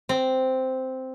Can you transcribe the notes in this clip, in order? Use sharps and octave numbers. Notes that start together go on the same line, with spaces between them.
C4